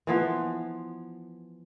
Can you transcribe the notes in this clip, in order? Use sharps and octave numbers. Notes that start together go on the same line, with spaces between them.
E3 F3 B3